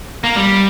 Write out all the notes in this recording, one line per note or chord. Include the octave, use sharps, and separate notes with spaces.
A#3
G3